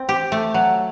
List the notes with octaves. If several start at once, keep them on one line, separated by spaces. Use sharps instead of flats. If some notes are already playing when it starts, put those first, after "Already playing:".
Already playing: C4
G4
A3
F#3